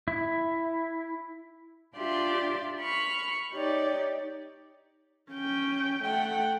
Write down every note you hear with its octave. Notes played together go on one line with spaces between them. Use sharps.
E4
D4 F4 G4 D5 E5 C6
B5 C#6 F6
D#4 G4 C#5 D5
C#4 G5
A3 F#5 G5